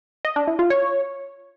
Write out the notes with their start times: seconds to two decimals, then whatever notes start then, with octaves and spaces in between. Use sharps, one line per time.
0.25 D#5
0.36 D4
0.47 E4
0.59 F4
0.70 C#5